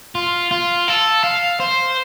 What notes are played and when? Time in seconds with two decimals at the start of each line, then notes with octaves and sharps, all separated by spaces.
0.15 F4
0.51 F4
0.88 A4
1.24 F5
1.60 C5